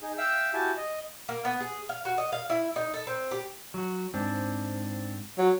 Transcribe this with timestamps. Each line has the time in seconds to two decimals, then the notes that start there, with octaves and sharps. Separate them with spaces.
0.02 D#4 G#4
0.18 E5 F5 G5 E6
0.54 E4 F#4 G4 G#5 A5
0.77 D#5
1.29 A#3
1.45 B3
1.60 G#4
1.89 F5
2.05 F#4
2.18 D#5
2.32 F5
2.50 E4
2.76 D#4
2.94 A4
3.07 C4
3.31 G4
3.74 F#3 F#4
4.14 G#2 C4 D4
5.38 F#3